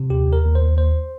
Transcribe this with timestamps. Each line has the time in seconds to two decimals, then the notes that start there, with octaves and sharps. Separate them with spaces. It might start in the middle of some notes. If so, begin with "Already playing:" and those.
Already playing: C3
0.10 D#2 G4
0.27 D#2
0.33 A#4
0.45 D#2
0.55 C5
0.62 D#2
0.77 D#2 C5